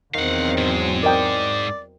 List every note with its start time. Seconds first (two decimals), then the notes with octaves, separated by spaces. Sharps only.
0.14 E2 D#3 F#3 C4 F5 F#5
0.58 G#2 G#3
1.03 A#4 D5 D#5 G5